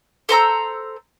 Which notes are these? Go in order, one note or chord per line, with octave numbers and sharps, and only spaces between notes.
A4 C5 A#5 E6